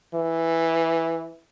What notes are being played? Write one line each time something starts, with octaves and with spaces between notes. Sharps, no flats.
E3